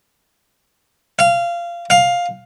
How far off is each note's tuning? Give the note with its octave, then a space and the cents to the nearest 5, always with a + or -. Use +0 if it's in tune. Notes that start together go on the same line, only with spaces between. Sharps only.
F5 -20
F5 +10